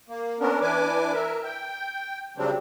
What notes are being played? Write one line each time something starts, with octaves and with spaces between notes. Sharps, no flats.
A#3
B3 C#4 D4 A#4
E3 D4 B4 G#5 D6
A#4 E5
G5
C#3 F#3 G3 C4 D4